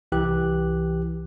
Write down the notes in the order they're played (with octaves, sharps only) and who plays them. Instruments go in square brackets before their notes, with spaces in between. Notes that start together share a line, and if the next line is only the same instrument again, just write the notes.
[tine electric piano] C2 E3 G4 F#6